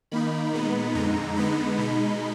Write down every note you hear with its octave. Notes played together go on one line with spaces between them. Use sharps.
D#3 A#3 D#4 B5
A#2 G#3 B3 D#4
F2 D3 G#3 D#4 A#5
D3 G#3 B3 D#4 B5
B2 G#3 D#4